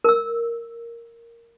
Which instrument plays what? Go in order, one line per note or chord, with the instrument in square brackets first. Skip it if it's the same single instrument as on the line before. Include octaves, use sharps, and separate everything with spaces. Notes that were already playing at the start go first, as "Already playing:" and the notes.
[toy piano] A#4 E6